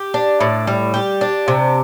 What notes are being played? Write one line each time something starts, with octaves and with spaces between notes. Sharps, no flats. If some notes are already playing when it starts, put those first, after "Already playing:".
Already playing: G4
D4
A2
G3
G4
D4
C3